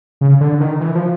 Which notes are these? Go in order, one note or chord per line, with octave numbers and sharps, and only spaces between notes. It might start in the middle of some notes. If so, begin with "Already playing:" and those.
C#3
D3
D#3
E3
F3